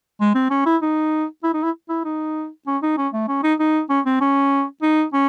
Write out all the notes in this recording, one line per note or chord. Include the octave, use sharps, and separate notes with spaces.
G#3
C4
C#4
E4
D#4
E4
D#4
E4
E4
D#4
C#4
D#4
C#4
A3
C#4
D#4
D#4
C#4
C4
C#4
D#4
C#4